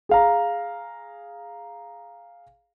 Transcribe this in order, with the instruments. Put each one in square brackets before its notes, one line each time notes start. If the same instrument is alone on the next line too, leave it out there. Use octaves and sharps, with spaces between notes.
[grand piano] G#4 F5 A#5